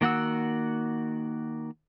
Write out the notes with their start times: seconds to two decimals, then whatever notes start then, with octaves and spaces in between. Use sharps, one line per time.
0.01 D#3 A#3 F#4 F#5 E6